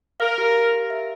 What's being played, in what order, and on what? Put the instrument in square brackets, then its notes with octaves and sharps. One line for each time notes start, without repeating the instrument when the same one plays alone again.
[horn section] A#4 [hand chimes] F5
[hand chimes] G4
F5
G4
E5